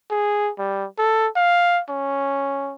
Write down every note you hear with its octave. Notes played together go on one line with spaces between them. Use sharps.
G#4
G3
A4
F5
C#4